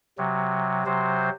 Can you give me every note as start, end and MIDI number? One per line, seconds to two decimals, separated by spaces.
0.18 0.85 48
0.18 0.85 54
0.86 1.30 48
0.86 1.30 54
0.86 1.30 72